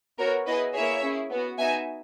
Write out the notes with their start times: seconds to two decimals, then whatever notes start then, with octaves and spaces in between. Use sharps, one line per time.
0.18 B3 F#4 A#4 C#5
0.46 B3 E4 G#4 B4 D#5
0.74 A#3 E4 G#4 C#5 E5
1.02 C#4 E4 G#4
1.31 B3 F#4
1.59 B3 D#4 F#4 E5 G#5